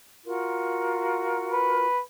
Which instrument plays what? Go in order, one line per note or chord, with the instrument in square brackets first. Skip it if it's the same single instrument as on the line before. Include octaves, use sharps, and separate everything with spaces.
[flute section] F4 F#4 A#4
[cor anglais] B4